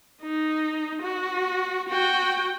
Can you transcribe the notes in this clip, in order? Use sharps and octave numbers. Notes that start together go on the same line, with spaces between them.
D#4
F#4
F#4 G5